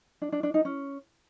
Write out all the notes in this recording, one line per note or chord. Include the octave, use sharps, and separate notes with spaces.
D4
D4
D4
D#4
C#4